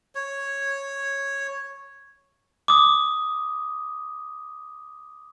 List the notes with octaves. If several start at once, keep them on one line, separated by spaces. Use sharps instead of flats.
C#5
D6 D#6